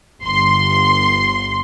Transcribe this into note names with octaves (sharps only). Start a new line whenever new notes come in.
G1 C6